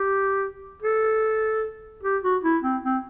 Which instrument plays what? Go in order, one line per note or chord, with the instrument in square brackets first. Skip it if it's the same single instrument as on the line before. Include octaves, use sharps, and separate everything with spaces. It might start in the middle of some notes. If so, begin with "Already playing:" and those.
Already playing: [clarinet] G4
A4
G4
F#4
E4
C4
C4